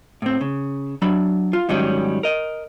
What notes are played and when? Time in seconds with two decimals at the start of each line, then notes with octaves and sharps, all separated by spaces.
0.22 A2 C4
0.41 C#3
1.02 F#3 D4 B5
1.53 F4
1.69 G#2 D#3 F#3 G3 C#4
2.23 A#4 D#5